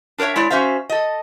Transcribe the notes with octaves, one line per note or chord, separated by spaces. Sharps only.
D4 A#4 C5 C#5 E5
G#3 E4 C#5 D5
C#4 F#4 C5 E5 F5
A4 D#5